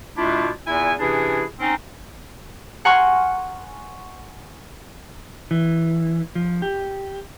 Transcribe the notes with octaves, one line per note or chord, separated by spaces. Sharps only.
B2 A3 D4 E4 F4
E2 A#2 E4 G#5
C3 E3 C#4 D4 E4 G#4
C4 C#4 D#4
F#5 G#5 A#5 C6 C#6 F6
E3
F3
G4